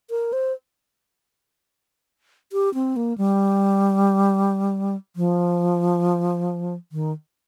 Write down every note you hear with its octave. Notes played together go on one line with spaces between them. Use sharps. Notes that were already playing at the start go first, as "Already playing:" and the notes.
A#4
C5
G4
C4
A#3
G3
F3
D#3